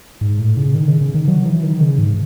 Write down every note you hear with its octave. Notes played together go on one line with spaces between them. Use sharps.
G#2
A2
C#3
D#3
C#3
C#3
D#3
F#3
E3
D#3
C#3
G#2